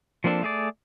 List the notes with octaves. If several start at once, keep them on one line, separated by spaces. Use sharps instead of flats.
F3 A#3 C4 D4 A4
A3 G#4 D5